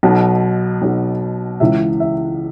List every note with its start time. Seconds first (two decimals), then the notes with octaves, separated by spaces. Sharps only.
0.03 B1 B2
0.82 B1 B2
1.60 C#2 C#3 E3 E5
2.00 E5